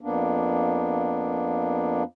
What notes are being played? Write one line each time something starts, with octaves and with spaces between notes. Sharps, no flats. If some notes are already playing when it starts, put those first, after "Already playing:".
F2 A#3 B3 D4